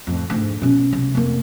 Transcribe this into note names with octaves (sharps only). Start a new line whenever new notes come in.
F2 A2
D2 G#2
B2 C#4
C2
F1 A#3